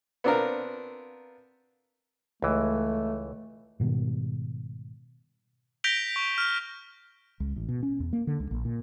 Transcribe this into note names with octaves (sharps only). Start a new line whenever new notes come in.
B3 C4 D4 F4 A#4
C#2 E3 A3
G#2 B2 D#3 G3
G6 A#6 B6 D7 F7 G7
C#6
F6
C#2
A1
B2
C#4
E2
A#3
D3
C#2
A#1
A#2